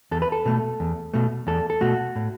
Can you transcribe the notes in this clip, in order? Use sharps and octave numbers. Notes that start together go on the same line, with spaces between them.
E2 A4
B4
A4
B2 A3
E2
B2 A3
E2 A4
A4
B2 A3 F#4
A2